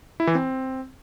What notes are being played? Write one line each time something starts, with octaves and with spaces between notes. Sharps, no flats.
E4
E3
C4